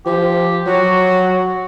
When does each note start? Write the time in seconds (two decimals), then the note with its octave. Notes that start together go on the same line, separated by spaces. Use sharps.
0.06 F3 G4
0.66 F#3 F#4